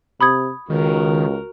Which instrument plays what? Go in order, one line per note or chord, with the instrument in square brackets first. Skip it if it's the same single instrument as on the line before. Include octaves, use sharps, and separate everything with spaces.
[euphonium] C3 [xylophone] B5 D#6 G#6
[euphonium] C#2 [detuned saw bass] D#3 [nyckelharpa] F#4 A#4